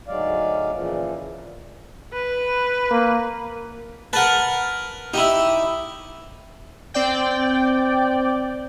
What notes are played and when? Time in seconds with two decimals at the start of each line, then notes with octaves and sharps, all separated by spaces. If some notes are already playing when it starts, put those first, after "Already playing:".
0.08 D2 G#2 F#3 G#3 D5 F5
0.73 A#2 C#3 E3 F3
2.13 B4
2.91 A#3
4.13 A#4 B4 F#5 A5
5.14 D#4 E4 G4
6.94 C4 D5 G5